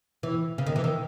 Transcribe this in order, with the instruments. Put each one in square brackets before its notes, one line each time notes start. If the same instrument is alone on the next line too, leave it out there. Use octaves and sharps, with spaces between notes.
[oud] E3
C#3
D#3
E3
D#3